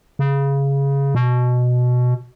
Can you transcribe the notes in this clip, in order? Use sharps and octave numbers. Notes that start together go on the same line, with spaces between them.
C#3
B2